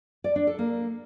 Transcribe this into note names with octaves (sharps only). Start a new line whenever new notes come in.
D5
D4
A4
A#3